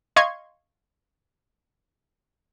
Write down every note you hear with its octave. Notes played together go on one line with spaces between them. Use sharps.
D#5 F5 C6 C#6 G#6